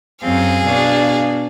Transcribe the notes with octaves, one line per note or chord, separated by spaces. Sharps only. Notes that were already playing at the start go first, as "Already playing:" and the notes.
F#2 C4 G#4 F5
B2 D4